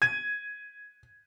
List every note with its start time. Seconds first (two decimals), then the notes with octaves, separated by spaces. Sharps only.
0.02 G#6 D#7